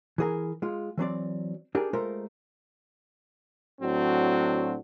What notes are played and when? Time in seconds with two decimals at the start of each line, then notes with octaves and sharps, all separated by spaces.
0.18 E3 G#4 A#4
0.62 G#3 F4
0.98 E3 F#3 C4 D5
1.75 D4 G4 G#4 A#4
1.93 G#3 A3 F4 A#4 C5
3.81 A2 F#3 C4 D4 F#4